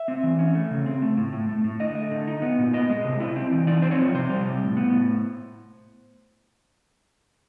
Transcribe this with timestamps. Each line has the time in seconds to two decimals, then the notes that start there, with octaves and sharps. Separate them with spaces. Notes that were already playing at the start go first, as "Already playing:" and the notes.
Already playing: E5
0.08 C4
0.23 E3
0.39 C#4
0.55 A3
0.71 C#3
0.86 C4
1.02 A3
1.17 A2
1.33 A2
1.49 A3
1.64 A2
1.80 D3 D#5
1.95 A3
2.11 D3
2.27 D#4
2.42 B3
2.58 A#2
2.73 B3 D#5
2.90 G#3
3.04 C3
3.20 E4
3.36 C4
3.52 E3
3.67 D#4 D5
3.82 C4 C5
3.91 C#5
3.99 F3
4.14 C3 C5
4.30 G3
4.45 C3
4.62 A2
4.77 B3
4.93 A2